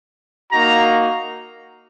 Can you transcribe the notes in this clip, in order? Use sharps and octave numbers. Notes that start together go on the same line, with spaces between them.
A#3 D#4 F#4 A#5